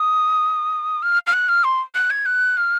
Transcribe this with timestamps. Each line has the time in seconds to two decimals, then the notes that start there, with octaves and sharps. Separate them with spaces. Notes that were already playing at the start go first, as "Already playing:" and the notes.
Already playing: D#6
1.02 F6
1.27 F6
1.33 F#6
1.49 F6
1.64 C6
1.95 F#6
2.10 G#6
2.26 F#6
2.57 F6